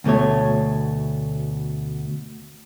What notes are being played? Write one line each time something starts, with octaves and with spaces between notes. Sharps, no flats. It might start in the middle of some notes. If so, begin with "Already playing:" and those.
D2 B2 E3 A3 C#5